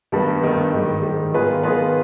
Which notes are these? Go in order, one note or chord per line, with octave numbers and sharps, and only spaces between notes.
G2 D#3 G3 B3
G2 D#3 G3 B3
G#2 D#3 G3
G#2 D#3 G3
D#3 B3 F4 G#4 B4
D#3 B3 F4 G#4 B4